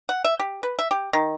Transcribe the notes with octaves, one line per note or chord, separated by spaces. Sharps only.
F#5
E5
G4
B4
E5
G4
D#3